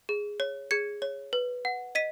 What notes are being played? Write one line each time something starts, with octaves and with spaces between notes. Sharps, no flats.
G#4
C#5
G#4 G#6 C#7
C#5
B4
F#5
D#5 B6 D#7